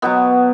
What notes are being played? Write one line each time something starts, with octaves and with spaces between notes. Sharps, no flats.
B2 F#3 B3